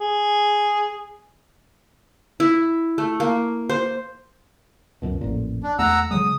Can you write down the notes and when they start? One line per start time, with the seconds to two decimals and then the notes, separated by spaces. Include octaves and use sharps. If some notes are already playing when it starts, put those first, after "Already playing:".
0.01 G#4
2.40 E4
2.98 A3
3.20 A#3
3.70 C5
5.02 C#2 F#2 B2
5.21 A1 F2 A#2
5.63 D4
5.79 E2 A3 F#5 A#5 E6
6.11 C#3 F#3 G#3 D#6